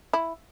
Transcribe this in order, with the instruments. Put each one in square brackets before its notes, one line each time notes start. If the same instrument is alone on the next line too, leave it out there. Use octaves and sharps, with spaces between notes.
[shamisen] E4